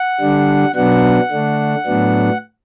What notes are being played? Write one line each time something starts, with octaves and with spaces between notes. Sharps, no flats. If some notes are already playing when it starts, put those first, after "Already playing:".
Already playing: F#5
D3 G3 D4
B2 F#3 B3 D4 F#5
D3 A3 D4
A2 F#3 B3 D4